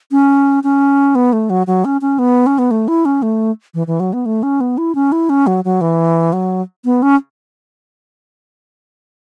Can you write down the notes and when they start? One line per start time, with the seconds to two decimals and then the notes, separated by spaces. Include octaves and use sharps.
0.11 C#4
0.64 C#4
1.15 B3
1.33 A3
1.50 F#3
1.67 F#3
1.85 C#4
2.01 C#4
2.19 B3
2.47 C#4
2.59 B3
2.71 A3
2.88 E4
3.05 C#4
3.22 A3
3.74 E3
3.87 E3
4.00 F#3
4.13 B3
4.26 A3
4.43 C#4
4.61 B3
4.78 E4
4.95 C#4
5.12 E4
5.30 C#4
5.47 F#3
5.65 F#3
5.81 E3
6.33 F#3
6.85 B3
7.02 C#4